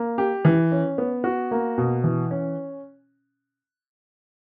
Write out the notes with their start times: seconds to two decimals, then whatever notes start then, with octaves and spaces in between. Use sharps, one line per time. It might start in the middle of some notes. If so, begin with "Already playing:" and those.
Already playing: A#3
0.18 G4
0.45 E3
0.72 C#4
0.98 B3
1.24 F#4
1.51 A#3
1.78 B2
2.04 E3
2.31 C#4